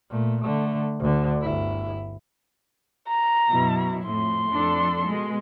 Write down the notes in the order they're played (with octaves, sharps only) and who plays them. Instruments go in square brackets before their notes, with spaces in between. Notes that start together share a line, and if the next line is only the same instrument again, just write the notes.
[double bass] A#2 A3
D3 A3
D2 D3
G1 E4
[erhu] A#5
[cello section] F#2 B2 E4
[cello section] F2 A2 [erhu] C6
[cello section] F2 D4 A4
B2 G#3